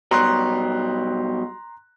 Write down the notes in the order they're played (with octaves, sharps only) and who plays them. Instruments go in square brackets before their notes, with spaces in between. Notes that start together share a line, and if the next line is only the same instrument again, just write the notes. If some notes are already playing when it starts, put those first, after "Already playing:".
[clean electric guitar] B2 F#3 G3 [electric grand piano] A#5 C6 F#6